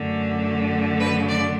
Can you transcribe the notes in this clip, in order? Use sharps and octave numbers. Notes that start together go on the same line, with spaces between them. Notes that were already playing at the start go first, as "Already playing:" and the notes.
Already playing: F#2 D3 A3
B4
D5